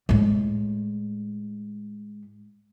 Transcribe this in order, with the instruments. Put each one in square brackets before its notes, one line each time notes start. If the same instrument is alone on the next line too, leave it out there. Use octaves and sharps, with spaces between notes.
[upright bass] A2 G#3